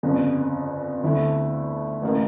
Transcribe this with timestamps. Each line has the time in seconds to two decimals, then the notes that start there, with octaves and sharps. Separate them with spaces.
0.03 G1 F2 C#3
1.03 D2 D3 A3 E4
2.02 A1 A2 E3 A#3